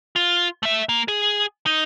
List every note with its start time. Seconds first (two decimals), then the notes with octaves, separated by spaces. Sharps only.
0.16 F4
0.63 A3 E5
0.89 A#3
1.08 G#4
1.66 D#4